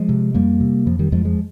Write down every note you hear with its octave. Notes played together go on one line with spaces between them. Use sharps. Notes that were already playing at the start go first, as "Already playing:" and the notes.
Already playing: F3 G#3
C3
F2 G3 A#3
C3
F2 F3
D#3 G3
F2 F3 G#3
F3 G#3